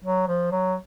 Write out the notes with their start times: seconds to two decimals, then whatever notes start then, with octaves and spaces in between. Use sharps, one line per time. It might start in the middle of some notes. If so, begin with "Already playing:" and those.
0.04 F#3
0.28 F3
0.52 F#3